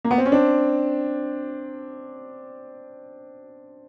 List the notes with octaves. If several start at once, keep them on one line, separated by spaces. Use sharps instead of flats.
A#3
B3
C4
C#4
C4 D4